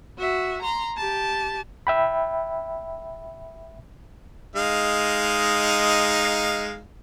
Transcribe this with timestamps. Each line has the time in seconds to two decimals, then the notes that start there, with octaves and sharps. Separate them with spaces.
0.18 F#4 E5
0.62 A#5 C6
0.97 G4 A5
1.87 E5 G5 B5
4.56 G#3 D#4 F5